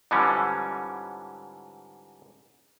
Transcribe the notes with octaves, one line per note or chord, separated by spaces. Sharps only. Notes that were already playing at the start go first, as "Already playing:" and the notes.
G#2 D3 E3 F3 G3 C#4